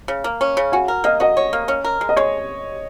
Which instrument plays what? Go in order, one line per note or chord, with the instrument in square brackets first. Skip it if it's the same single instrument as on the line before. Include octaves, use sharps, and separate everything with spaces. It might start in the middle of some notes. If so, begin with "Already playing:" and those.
[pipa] C#3
A#3
C#4
C#3
[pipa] F#4 [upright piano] G#5
[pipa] A#4
[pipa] A#3 [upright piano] D#5
[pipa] F#4 [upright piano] D#5
[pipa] C#5
A#3
C#4
A#4
G#3
[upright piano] D#5
[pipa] G#3 [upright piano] C#5